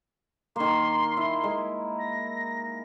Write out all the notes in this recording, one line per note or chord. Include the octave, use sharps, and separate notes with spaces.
D#3 A#3 C6
E4
G#3
A#6